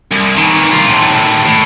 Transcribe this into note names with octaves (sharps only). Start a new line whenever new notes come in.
C2
D#3 E3
C2 F4
D#2 A2
A2